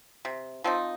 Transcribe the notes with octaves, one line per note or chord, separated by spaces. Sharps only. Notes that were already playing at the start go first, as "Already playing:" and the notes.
C3
F3 C4 D#4